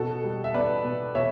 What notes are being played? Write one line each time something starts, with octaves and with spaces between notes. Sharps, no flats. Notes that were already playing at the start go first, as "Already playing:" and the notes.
Already playing: B2 F#4 A4
G3
E5
B3 B4 D5
B2
B2 C#5 E5